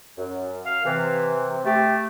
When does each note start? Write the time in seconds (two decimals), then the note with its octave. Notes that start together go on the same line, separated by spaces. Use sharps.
0.17 F#2
0.66 F5
0.85 C3 E3
1.65 A3 G4